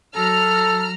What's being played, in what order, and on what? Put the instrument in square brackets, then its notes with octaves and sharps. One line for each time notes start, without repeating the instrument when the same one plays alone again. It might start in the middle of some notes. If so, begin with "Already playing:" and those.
[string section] F#3 A#5 F6 [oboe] A4